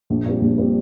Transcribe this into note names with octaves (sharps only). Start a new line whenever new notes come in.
A#1
A#2 G3 C4
A#1
A#2 G3 C4